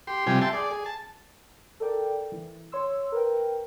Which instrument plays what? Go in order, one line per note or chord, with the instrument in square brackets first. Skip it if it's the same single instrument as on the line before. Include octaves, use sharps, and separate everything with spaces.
[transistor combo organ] G4 C6
C3 F3 G3 G4 G#5
E5 G5 A5 C6
G#4 D5
G#4
A5
[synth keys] A4 A#4 D5 G5
E3
C#5 C6 E6
A#4 B4 G5